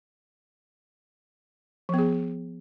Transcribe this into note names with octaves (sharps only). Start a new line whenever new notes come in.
F3 B3 G#4